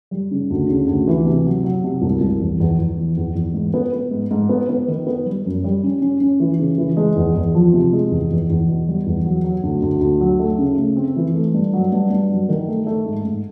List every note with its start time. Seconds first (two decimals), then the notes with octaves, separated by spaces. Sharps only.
0.11 G3
0.31 C#3
0.50 D2
0.69 C#3
0.87 D2
1.07 E3
1.25 C3
1.46 F#3
1.64 F#3
1.84 C3
2.02 C2
2.21 C2
2.41 E2
2.60 E2
2.78 E2
2.97 E3
3.17 E2
3.35 E2
3.54 G#2
3.74 B3
3.93 B3
4.11 G#2
4.31 G#2
4.49 B3
4.69 B3
4.88 D#3
5.07 B3
5.26 G3
5.45 F#2
5.64 G3
5.83 C#4
6.01 C#4
6.21 C#4
6.40 E3
6.59 C#3
6.78 E3
6.97 G#3
7.16 E2
7.35 E2
7.54 F3
7.73 C3
7.93 G#3
8.11 E2
8.31 E2
8.50 E2
8.68 B2
8.88 G3
9.06 E2
9.25 F#3
9.44 F#3
9.63 D2
9.82 D2
10.01 D2
10.21 F#3
10.39 A3
10.59 C#3
10.78 A3
10.97 C4
11.16 E3
11.34 A3
11.54 G2
11.73 F#3
11.92 G2
12.10 G2
12.31 F#3
12.49 D#3
12.68 A3
12.86 A3
13.06 G#2
13.25 G#2